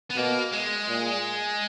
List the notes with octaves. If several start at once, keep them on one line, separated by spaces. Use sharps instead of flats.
B3
B2 A#3
G#3
A#2